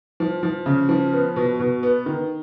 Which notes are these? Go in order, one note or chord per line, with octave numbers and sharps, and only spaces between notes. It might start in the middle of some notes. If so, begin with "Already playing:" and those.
F3
F3
C#3
F3
B3
B2
B2
B3
D#3